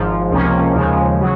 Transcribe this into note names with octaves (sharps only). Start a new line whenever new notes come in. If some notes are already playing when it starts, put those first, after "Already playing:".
Already playing: G#1 G#2 F3
C#2 C3 F3 A#3 C#4
D#2 C#3 F3 G#3
C#3 F#3